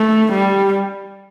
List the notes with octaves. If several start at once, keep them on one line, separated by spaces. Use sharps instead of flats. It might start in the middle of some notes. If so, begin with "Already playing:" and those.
Already playing: A3
G3